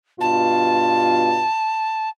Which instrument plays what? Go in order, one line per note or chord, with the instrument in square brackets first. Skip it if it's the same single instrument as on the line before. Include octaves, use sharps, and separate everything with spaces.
[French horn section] G2 B2 F4 [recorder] A5